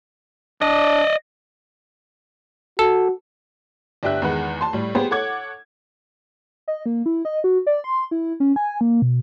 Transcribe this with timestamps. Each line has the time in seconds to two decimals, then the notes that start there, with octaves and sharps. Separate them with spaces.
0.62 D4 D5 D#5
2.79 F#4 A4
4.03 G1 D4 G4 E5 F#6
4.22 E2 D#3 G#3 B4 F#5
4.61 A5 C6
4.73 A2 G3
4.95 B3 G4 G#4 C5
5.11 A4 C#5 F#5 D6 G#6
6.68 D#5
6.86 A#3
7.06 E4
7.25 D#5
7.44 F#4
7.67 D5
7.84 C6
8.11 E4
8.40 C#4
8.56 G#5
8.81 A#3
9.02 B2